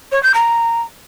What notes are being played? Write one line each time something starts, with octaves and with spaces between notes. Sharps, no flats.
C#5
G6
A#5